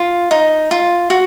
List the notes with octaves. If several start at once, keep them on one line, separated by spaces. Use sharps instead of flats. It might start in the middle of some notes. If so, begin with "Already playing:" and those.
Already playing: F4
D#4
F4
F#4